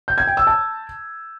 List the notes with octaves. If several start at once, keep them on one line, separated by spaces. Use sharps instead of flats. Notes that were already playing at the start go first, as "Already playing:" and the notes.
G6
G#6
G5
E6
A5